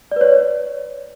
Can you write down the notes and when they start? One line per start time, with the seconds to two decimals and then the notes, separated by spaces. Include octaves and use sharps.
0.12 D5
0.16 B4
0.21 C#5